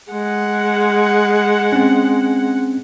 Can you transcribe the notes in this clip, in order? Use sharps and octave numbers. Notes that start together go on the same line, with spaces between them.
G#3 F#5
C4 C#4